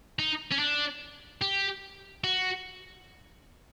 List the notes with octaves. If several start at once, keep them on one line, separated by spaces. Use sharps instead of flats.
D#4
C#4
D4
G4
F#4